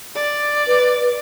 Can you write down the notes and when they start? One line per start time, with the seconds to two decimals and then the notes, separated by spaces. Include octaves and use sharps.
0.15 D5
0.67 B4